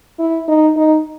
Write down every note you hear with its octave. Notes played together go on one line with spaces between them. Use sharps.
E4
D#4
D#4